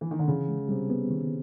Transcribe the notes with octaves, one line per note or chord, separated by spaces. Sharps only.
E3
D#3
D3
C#3 E3
G#3
C3 G3
B3
D#3